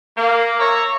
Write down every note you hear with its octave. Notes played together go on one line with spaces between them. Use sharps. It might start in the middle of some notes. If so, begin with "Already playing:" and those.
A#3
C#5 E5 A#5